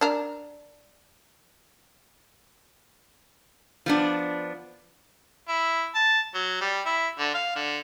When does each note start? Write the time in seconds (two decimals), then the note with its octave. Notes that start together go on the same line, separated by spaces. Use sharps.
0.01 D4 A#4
3.86 F3 B3 D4
5.48 E4
5.95 A5
6.34 F#3
6.61 G3
6.85 E4
7.19 D3
7.34 F5
7.55 D3